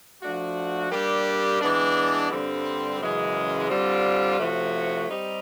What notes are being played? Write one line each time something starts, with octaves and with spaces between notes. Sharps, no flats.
F3 A3 D4 F#4
G3 A#3 D4 G4
E3 G#3 B3 D4
G2 D3 G3 C4
F#2 C#3 E3 G#3
D3 G3 C4 F4
C3 F3 A3 C#4 F#4
G3 C4 D#4 G4